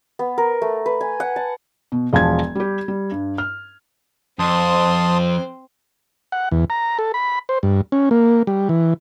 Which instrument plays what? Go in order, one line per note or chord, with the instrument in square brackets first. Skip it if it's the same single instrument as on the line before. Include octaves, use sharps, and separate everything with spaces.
[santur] B3
A#4
A3
B4
G#5
F#5
A5
[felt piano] B2
E1 F3 A5 G#6
G3 G4
G3
G2
F6
[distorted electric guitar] F2 [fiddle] C4 C5 [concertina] A5 C6 D#6
[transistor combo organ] F#5
E2
A#5
A4
B5
C5
G2
C#4
A#3
G3
E3